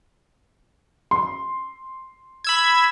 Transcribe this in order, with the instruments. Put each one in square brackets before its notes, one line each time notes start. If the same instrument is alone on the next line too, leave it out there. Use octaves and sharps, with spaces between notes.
[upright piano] C6
[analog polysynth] B5 E6 G#6